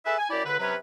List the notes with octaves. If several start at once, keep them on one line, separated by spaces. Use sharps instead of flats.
G#4 A4 B4 E5
G#5
F#2 E4 G4 D5
C#2 D3 B4
C3 F#3 C#4 B4